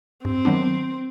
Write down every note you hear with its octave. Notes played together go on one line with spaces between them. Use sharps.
G2 C4
D#3 F#3 B3 D4